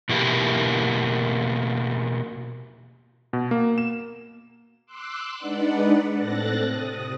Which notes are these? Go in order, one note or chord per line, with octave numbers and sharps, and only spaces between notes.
B2 E3 A#3 E4 G4
B2
A#3
E7
C6 D6 E6 F#6
G#3 D4 D#4 B4 D5 F#5
A2 C4 A4 F#6 A6 A#6
C3 D#6